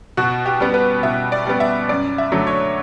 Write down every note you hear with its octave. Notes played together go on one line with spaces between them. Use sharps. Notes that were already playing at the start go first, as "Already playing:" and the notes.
B2 F#4
G4
G3 B3
B4
B2 E5
D5
G3 B3
E5
F#2 D5
E5
D3 F#3 A3
C#5